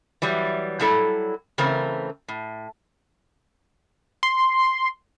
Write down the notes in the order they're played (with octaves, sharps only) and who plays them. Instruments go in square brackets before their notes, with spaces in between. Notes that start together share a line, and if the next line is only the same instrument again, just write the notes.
[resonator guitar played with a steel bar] E3 F#3 G3
F#3 G3 E4 A4
C#3 E3 A3 C4 A#4
A2
[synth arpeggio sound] C6